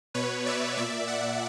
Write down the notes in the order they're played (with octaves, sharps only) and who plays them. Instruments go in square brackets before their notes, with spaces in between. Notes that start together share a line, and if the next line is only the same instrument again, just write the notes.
[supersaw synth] B2 B4 C#5
D5 E5
A#2 D5 E5
E5 F#5